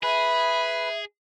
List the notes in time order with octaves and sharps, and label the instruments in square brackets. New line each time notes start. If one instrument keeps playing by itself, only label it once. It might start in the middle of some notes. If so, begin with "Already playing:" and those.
[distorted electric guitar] G#4 [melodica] B4 [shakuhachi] E5 [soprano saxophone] B5